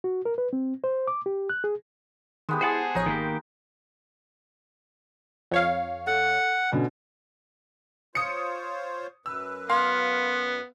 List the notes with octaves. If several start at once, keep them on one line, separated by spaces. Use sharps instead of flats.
F#4
A#4
B4
C4
C5
D6
G4
F#6
G#4
D#3 G#3 B3 G4
E4 G#4 C5 F#5 A5
A1 F3 D#4 C#5
G#1 D#3 A#3 G4
F2 C#5 F5
A4 F#5
B2 D3 C#4
F4 C5 C#5 D#6 C#7
F#2 B4 E6
B3 F5 C6